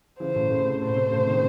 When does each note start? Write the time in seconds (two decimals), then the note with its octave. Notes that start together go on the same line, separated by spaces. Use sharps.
0.19 C#3 E3 C5
0.35 A2 C#3
0.50 A2 C#3
0.66 C3
0.82 A2 C5
0.96 C3
1.11 A2 C#3
1.27 C3 D#3